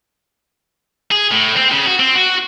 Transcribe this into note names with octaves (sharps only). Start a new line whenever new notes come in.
G#4
A2
C4
C#3
F#4
C4
F#4